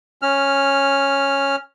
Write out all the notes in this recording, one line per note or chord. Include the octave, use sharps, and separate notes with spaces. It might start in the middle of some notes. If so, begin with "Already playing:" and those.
C#4 F6